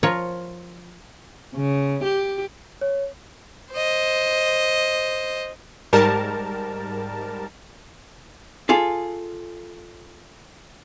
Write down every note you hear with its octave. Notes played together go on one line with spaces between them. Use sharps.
F3 F4 A#4 C#5
C#3
G4
C#5
C5 D#5
G#2 G3 A#4 A5
F4 G#4 A4